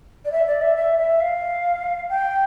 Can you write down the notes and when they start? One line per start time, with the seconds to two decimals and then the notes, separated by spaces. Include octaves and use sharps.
0.25 D5
0.32 E5
0.47 D5
0.61 E5
0.76 E5
0.99 E5
1.20 F5
2.09 G5